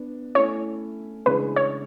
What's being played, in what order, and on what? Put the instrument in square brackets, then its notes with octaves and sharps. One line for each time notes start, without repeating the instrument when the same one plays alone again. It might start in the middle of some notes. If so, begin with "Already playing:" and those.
Already playing: [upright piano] B3 D4
[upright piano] A3 C#4 E4 [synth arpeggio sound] C#5
[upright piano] C#3 E3 G#3 D4 G#4 [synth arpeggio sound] B4
[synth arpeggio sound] C#5